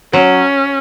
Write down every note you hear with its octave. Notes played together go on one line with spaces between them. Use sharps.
F#3 C#4